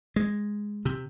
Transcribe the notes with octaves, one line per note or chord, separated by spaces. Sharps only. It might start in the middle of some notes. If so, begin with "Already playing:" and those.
G#3
C3